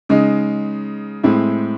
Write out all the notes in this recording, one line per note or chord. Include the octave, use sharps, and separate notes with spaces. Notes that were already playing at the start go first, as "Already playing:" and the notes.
C#3 G#3 D#4
A2 G#3 C4 E4